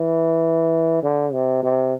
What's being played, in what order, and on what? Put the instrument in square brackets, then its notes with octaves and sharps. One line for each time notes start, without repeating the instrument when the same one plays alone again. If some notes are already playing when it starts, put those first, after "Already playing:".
Already playing: [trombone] E3
D3
C3
C3